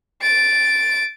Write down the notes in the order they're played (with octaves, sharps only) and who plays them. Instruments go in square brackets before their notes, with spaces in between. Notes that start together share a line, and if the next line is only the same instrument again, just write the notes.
[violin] A6 D7